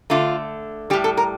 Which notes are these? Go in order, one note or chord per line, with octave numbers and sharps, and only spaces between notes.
D3 A3 F4
A2 G3 G4
A4
A#4